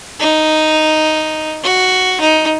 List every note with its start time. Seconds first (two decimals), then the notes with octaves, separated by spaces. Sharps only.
0.20 D#4
1.63 F#4
2.20 D#4